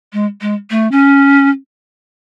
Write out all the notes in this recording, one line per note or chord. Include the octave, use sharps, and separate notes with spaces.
G#3
G#3
A3
C#4